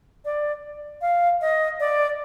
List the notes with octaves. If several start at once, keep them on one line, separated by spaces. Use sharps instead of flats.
D5
F5
D#5
D5